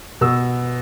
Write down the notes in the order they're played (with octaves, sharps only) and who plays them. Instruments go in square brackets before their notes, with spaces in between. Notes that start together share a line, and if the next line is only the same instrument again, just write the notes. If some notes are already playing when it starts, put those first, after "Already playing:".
[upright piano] B2 E6